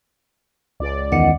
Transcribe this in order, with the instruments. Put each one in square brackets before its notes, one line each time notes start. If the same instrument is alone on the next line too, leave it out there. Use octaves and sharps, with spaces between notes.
[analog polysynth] C#2 D5
[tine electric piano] E2 D#3 C#7 [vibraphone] D#5 F#5